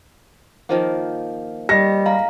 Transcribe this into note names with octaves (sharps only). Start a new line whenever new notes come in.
D#3 F3 A#3
G3 G4 D#5 A#6
G#3 F5 A#5